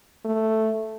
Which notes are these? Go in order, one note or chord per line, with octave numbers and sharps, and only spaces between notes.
A3